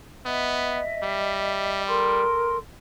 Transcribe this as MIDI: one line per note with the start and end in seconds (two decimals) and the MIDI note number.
0.25 0.81 59
0.25 1.80 75
0.25 1.80 76
1.03 2.25 55
1.86 2.56 69
1.86 2.56 70
1.86 2.56 84